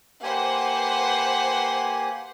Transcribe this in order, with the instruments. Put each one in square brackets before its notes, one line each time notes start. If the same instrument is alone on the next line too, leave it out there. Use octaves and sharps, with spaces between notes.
[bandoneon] A#3 G4 G#5 [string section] B4 C5 F#5